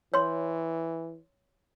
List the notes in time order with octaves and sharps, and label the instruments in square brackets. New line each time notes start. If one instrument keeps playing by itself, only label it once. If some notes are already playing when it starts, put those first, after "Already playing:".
[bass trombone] E3 [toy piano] C#5 C6